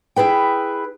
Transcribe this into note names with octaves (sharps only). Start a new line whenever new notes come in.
E4 G#4 B4 G5